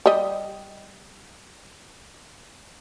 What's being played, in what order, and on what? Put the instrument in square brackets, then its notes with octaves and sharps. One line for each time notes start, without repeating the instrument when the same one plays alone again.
[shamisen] G3 D#5